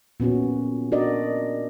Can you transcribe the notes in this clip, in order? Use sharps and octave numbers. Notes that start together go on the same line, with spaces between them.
A#2 B3 C#4 F#4
D4 F#4 A#4 D5 D#5